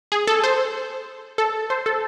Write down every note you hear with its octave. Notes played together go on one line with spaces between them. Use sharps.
G#4
A4
C5
A4
C5
A4